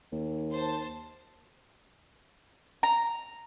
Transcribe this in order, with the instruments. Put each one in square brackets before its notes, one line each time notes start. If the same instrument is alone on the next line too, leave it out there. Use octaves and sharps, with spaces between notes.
[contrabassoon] D#2
[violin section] C5 A5
[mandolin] A#5